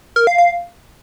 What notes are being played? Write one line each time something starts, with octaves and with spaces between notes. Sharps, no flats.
A#4
F5
F5